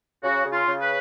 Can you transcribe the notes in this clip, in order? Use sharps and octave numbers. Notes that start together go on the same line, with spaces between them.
C#3 F#4
C#3
F4
C#3
B4